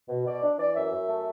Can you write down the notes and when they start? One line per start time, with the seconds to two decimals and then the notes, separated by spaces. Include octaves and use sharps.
0.09 B2
0.25 B2 D5
0.43 D4
0.59 E3 D5
0.76 F#2 E5
0.92 F#2
1.09 A3